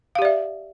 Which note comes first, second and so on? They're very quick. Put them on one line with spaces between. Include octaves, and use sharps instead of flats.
F5 G4 D5 E5